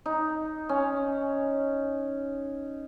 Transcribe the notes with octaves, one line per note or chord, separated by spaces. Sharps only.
D#4
C#4